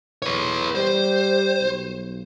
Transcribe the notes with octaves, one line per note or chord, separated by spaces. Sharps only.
E2 B4 C#5
G3 C5
B1